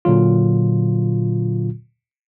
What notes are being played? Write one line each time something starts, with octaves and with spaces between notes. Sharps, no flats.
A#2 D3 F#3 F4